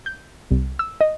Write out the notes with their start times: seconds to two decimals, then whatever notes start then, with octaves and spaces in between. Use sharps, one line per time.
0.06 G6
0.51 C2
0.79 E6
1.01 D#5